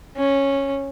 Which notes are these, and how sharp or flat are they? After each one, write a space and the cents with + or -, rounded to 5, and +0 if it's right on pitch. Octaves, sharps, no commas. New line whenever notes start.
C#4 -10